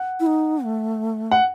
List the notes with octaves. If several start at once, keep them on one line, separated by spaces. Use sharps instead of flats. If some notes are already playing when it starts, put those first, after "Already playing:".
Already playing: F#5
E4
D#4
A3
F#5